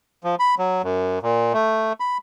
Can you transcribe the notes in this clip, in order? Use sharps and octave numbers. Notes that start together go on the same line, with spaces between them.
F3
B5
F#3
F#2
A#2
A3
B5